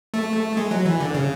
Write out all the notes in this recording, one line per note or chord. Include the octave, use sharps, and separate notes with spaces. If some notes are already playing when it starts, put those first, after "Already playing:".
A3
G#3
F#3
E3
D3
C#3